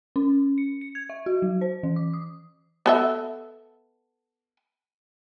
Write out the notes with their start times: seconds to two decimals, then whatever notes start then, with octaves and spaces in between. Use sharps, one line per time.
0.16 C#4
0.58 C#7
0.81 C#7
0.95 G#6
1.10 E5
1.26 F#4
1.42 F#3
1.61 C5
1.83 E3
1.96 D6
2.14 D#6
2.86 B3 A4 E5